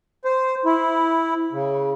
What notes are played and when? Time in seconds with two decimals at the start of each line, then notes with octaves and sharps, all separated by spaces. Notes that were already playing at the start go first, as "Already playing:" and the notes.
0.25 C5
0.65 E4
1.52 C#3